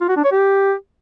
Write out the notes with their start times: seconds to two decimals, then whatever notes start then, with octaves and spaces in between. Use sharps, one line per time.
0.01 F4
0.09 F#4
0.16 D4
0.24 C#5
0.32 G4